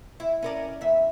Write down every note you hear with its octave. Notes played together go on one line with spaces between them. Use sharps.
E4
C#4 A#4 D5
E2 E5